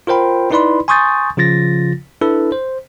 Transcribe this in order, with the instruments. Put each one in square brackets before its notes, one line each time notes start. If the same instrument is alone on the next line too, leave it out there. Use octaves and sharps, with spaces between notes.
[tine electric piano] F4 A#4 C5 G5 B5
D#4 E4 B4 D5 B5 C6
G#5 C6 C#6 D#6 G6 A6
C#3 F3 F4 A6 A#6
D4 E4 A4 B4
C5